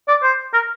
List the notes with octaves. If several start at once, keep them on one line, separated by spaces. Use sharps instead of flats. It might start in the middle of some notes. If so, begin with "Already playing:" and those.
D5
C5
A#4